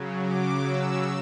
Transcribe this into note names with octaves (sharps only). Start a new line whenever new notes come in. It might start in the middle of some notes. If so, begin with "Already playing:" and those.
Already playing: C#3 F#3
D6
E6